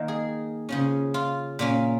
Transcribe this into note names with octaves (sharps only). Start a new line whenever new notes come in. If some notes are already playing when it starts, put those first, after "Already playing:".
Already playing: D#3 A#3 D#4 A#4
G#4
C#3 F3 C#4
F4
A#2 A#3 C#4